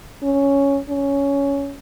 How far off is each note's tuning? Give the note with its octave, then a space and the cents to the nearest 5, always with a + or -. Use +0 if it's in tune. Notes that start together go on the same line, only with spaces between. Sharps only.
C#4 +5
C#4 +10